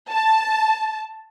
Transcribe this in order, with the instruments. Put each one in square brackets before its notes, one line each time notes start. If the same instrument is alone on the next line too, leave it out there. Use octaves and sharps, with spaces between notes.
[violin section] A5